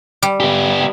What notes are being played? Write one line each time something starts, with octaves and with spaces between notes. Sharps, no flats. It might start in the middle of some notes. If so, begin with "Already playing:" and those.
G3
B3 G4